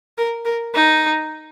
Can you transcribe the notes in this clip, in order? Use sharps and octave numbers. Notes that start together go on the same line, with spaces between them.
A#4
A#4
D#4